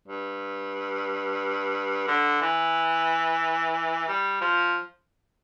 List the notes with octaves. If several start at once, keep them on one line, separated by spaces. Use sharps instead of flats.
G2
D3
E3
G3
F3